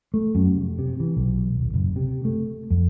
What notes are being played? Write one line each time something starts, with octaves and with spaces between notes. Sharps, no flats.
A3
F#2
F1
C3
E3
B1
D#1
F#1
C3
A3
F2